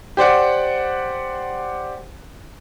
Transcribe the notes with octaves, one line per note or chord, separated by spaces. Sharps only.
G4 C5 D5 F#5